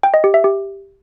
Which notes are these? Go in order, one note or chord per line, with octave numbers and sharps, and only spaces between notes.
G5
D#5
G4
E5
G4